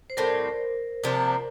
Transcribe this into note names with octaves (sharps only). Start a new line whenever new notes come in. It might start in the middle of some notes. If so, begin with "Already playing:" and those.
C5
A2 G3 C4 A#4
C3 F3 A#3 D4